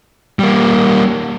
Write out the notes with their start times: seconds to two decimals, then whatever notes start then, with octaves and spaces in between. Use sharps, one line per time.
0.39 G3 A#3